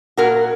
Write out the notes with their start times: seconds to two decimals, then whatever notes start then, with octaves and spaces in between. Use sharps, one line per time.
0.17 A#2 F#4 A#4